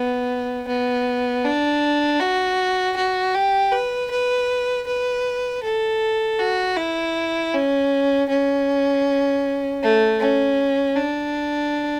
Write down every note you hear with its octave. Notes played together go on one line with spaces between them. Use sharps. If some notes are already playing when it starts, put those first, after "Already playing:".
Already playing: B3
B3
D4
F#4
F#4
G4
B4
B4
B4
A4
F#4
E4
C#4
C#4
A3
C#4
D4